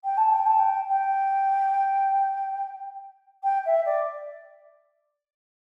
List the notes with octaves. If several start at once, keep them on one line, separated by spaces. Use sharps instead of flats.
G5
A5
G5
A5
G5
G5
G5
E5
D5